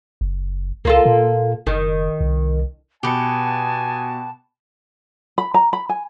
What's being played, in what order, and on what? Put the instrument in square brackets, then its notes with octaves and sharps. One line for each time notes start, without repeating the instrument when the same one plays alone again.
[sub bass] F#1
[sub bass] C#2 [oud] A#3 F4 A4
[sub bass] A#2
[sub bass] F#1 [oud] D#3
[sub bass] C2
[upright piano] B2 C#7 [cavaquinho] G4 B4 [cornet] G#5 [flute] A5
[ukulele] B5
A#5
B5
G#5